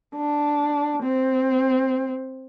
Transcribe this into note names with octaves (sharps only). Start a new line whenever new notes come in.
D4
C4